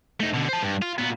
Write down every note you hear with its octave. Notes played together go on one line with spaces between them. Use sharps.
A3 D#4
B2 D3
C5 A5
G2
F4
A#2 B3